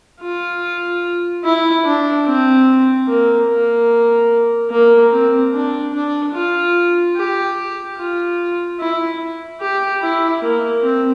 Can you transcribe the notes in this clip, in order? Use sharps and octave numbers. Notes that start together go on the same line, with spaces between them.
F4
E4
D4
C4
A#3
A#3
A#3
C4
D4
D4
F4
G4
F4
E4
G4
E4
A#3
C4